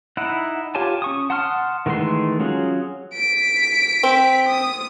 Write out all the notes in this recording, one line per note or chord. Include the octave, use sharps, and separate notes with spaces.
D#4 E4 F#5
F4 G4 C#5 G#5 A5
C#4 C#6 D#6
F#5 A5 C6 D#6 F6
D#3 E3 G#3 A3 C6
F#3 C#4 F4 G#4
B6 D7
C4
D#6